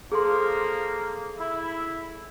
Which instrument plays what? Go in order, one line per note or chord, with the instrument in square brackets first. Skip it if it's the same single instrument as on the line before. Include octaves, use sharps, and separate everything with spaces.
[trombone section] F3 A#3 [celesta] G#4 A4 C6
[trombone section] E4